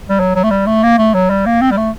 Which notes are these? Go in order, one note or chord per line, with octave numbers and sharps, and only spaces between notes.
G3
F#3
F#3
A3
G3
A3
A#3
A3
F#3
G3
A#3
C4
G3
A3